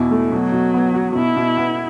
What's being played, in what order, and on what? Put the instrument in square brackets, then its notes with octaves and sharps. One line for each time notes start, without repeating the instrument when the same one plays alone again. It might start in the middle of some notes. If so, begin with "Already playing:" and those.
Already playing: [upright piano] E2 B2 E4
A3
[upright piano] B2 [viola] F#3
[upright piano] B2
B3
F#4
[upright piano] B2 [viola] E4
[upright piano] B2
B3